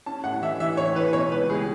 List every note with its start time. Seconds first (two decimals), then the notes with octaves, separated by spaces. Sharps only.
0.06 C#4 A5
0.24 A2 F#5
0.42 E3 E5
0.60 E3 E5
0.77 A2 C#5
0.95 E3 B4
1.13 B2 C#5
1.32 C#2 B4
1.49 C#2 G#4